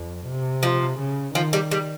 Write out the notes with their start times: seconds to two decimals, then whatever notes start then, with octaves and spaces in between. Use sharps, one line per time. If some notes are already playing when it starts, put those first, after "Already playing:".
Already playing: F2
0.27 C3
0.63 F3
0.99 C#3
1.35 D#3 F3
1.53 G3
1.71 G3